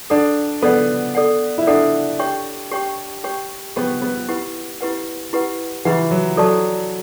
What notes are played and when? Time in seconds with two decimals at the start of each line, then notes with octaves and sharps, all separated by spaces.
0.10 D4 A4 D5 F#5
0.62 B3 A4 D5 F#5
1.15 A4 D5 F#5
1.58 E4
1.67 D4 A4 D5 F#5
2.19 G4 C#5 G5 C#6
2.71 G4 C#5 G5 C#6
3.24 G4 C#5 G5 C#6
3.76 B3 G4 C#5 G5 C#6
4.02 B3
4.29 E4 G4 B4 F#5
4.81 E4 G4 B4 F#5
5.33 E4 G4 B4 F#5
5.85 E3 E4 G4 B4 F#5
6.11 F#3
6.37 F#3 A4 D5 A5 C#6